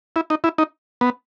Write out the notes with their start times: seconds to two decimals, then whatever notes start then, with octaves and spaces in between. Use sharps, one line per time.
0.16 E4
0.30 D#4
0.44 E4
0.58 D#4
1.01 B3